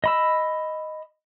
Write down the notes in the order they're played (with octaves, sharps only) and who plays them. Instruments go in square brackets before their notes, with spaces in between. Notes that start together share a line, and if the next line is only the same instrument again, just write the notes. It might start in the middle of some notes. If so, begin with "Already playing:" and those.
[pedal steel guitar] D#5 B5 E6